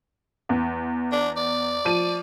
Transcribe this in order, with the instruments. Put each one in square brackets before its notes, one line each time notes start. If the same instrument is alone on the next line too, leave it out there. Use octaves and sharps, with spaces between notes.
[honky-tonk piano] E2
[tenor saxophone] D4
D5
[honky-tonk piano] F3 D#7